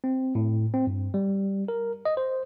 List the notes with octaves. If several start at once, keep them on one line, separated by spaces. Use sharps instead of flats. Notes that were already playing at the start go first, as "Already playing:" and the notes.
C4
A2
C4
G2
G3
A#4
D#5
C5